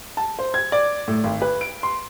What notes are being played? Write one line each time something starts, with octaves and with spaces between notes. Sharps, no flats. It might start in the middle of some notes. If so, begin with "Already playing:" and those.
A5
C5
G#6
D5
A2
G#1
B4
D7
C6